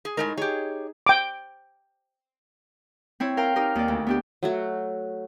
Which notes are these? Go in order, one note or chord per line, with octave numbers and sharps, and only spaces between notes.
G#4
A2 G#3 D#4 A#4
G4 G#4 C#5
G5 D6
C4 E4 C#5
A#4 F5 G5 A#5
D#4 G4 A#4 F6
D#2 D5
D2
B3 D4 G4
F#3 A3 F#4